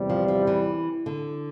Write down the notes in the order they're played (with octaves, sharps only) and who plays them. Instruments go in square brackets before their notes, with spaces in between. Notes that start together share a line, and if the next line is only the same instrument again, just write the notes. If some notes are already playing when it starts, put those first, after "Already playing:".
Already playing: [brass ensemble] E2 C3 G3
[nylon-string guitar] F3
F3
E3
D3